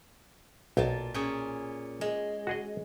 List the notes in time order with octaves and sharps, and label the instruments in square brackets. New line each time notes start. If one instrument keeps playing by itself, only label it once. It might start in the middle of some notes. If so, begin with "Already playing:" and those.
[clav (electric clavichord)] B1 [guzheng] A#2 A5
[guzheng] A#2 C#4 G#4
G#3
[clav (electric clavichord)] F#4 G#4 D#5